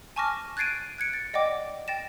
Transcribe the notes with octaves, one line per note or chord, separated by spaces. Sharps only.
G#5 A5 C#6 D6 F6 A#6
F#6 G#6 A6 C7 D7 D#7
F#6 G#6 C#7 D7
A6
D5 D#5 F#5 G5 D6
G5 A6 A#6 E7